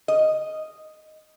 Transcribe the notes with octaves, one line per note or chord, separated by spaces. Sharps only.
D#5